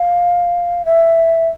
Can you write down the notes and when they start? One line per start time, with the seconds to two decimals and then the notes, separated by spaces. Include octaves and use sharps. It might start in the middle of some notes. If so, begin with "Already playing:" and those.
Already playing: F5
0.85 E5